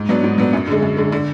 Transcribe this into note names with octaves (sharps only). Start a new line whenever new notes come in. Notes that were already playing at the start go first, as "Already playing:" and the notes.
Already playing: G#2
F#3 B3 D4
G#2
F#3 B3 D4
F#2
D3 G#3
F#2
D3 G#3
D3